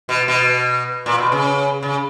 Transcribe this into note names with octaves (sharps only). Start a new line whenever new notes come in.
B2
B2
A#2
B2
C#3
C#3